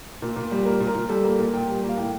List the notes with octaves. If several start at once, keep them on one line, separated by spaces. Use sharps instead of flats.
A#2
A#2
G3
A#3 A#4
A#2
A#4
A#2
G3 A4
A#3
A#2
A#2 G5
G3
A#3
F5
A2 G5